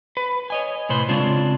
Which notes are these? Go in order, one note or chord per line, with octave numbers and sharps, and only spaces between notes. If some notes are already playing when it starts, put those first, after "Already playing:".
B4
C#5 D#5 G#5
A2 C3 B4 C5
C#3 G#3 C4 D4 F4